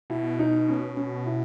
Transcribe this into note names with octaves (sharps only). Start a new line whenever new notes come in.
B2 E4
D#4
C#4
C#4
E4